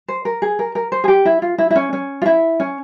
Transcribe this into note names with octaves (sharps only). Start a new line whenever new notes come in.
C5
A#4
G#4
A#4
A#4
C5
G#4
G4
E4
F4
E4
E4
C#4
C#4
F4
E4
C#4